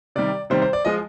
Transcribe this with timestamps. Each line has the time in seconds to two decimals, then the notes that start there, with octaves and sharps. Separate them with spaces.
0.16 C3 D#3 G3 D5
0.50 C3 D#3 G3 C5
0.62 C5
0.73 D5
0.85 F3 G#3 D#5